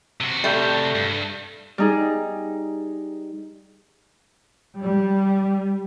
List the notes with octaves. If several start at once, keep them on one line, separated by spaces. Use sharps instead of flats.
C3 F#4
G3 A3
G2
G3 D#4 G#4
G3